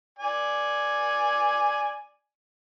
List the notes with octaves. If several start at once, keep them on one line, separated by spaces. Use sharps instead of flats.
D5 G#5